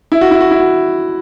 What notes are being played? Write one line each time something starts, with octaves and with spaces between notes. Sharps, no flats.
E4
F#4
E4
F#4
E4
F#4